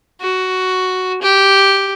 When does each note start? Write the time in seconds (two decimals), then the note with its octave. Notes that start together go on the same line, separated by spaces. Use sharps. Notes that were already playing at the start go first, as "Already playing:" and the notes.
0.21 F#4
1.22 G4